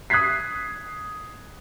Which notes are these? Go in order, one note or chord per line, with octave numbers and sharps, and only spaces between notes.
D#6 F#6 G#6 B6 C7